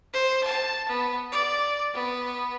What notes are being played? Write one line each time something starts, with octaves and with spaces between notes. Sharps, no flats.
C5
A5
B3
D5
B3